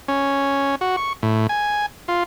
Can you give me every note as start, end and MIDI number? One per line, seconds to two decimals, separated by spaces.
0.08 0.75 61
0.81 0.96 66
0.97 1.13 85
1.23 1.47 45
1.49 1.86 80
2.08 2.23 65